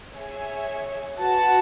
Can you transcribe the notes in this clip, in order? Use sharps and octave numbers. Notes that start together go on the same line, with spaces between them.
G#4 C#5 E5 G#5
F#4 B4 F#5 A5